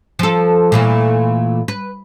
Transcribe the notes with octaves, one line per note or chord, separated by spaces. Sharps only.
F3 A4
A#2 E3 A3
B4